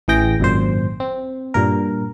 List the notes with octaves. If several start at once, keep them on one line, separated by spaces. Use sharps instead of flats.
A1 E3 G#4 G5 A#6
G#1 F#2 A#2 C5
C4
G2 A#2 A#4